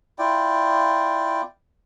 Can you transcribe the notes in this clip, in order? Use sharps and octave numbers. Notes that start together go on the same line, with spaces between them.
E4 F4 D5 G5